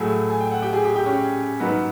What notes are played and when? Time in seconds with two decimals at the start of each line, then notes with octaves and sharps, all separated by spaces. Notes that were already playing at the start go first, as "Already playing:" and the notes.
Already playing: A2 F#3 A3 G#4 G#5
0.30 G#5
0.40 G5
0.51 F#5
0.62 G4 G5
0.73 G#4 G#5
0.84 G4 G5
0.96 G4 G5
1.06 C#4 C#5
1.60 G#2 D#3 F#3 A#3 B3 B4